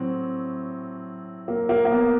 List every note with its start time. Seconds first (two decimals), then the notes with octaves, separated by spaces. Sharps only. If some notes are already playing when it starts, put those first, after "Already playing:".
Already playing: A2 F#3 C4
1.48 A#3
1.69 A#3
1.85 A#3
1.91 B3